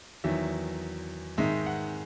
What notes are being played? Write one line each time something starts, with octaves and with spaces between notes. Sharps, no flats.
E2 D#3 F#3 E5
G#2 D#3 G#3 E5
F#5